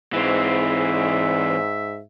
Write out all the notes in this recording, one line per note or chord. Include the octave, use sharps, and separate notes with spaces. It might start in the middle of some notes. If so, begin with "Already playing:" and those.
G#2 E3 C4 E5